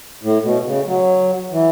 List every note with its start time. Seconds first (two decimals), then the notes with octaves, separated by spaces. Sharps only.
0.23 A2
0.43 B2
0.65 C#3
0.86 F#3
1.52 E3